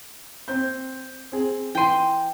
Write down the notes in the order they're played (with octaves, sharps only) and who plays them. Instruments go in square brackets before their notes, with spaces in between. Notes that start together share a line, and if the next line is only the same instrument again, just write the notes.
[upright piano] C4 G6
C4 G#4
[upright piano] E3 D#7 [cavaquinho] G5 C6